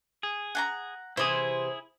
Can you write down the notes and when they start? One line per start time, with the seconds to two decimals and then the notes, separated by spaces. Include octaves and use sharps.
0.23 G#4
0.55 F#5 G#5 A#5
1.17 C3 E3 E4 G#4 C5 D#6